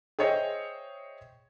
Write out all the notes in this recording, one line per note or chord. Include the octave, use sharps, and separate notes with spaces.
G#4 C5 C#5 D#5 E5 G5